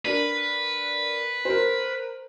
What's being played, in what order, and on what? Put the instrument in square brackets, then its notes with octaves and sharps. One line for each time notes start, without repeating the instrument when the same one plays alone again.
[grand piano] D4 A#4 [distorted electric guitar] B4
[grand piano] A#4 C5